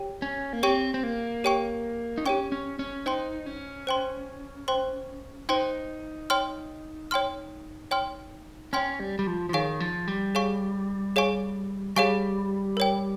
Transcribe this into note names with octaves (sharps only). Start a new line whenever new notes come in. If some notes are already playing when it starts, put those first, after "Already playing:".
Already playing: G4 C#5 G5
C#4
A#3
C4 G4 C#5 G5 C#6
C4
A#3
G4 C#5 G5 C#6
D#4
C#4 G4 C#5 G5 C#6
C#4
C#4
D#4 C5 G5 C6
C#4
C5 G5 C6
C5 G5 C6
D#4 C5 G5 C6
C#5 G5 C6 F6
C#5 G5 C6 F6
C#5 G5 C6 F6
C#4 C#5 G5 C6 F6
G3
G3
F3
F3
D#3 G#4 C#5 F5 G#5 C#6
F3
G3
G#4 C#5 F5 G#5 C#6
G#4 C#5 F5 G#5 C#6
G3 G#4 C#5 F5 G#5 C#6
A#4 C#5 G5